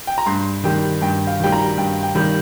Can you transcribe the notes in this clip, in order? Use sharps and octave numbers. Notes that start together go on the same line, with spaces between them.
G5
A#5
G2 C6
D#3 G3 G5
G2 G5
F5
D#3 G3 G5
A#5
G2 G5
G5
D#3 G3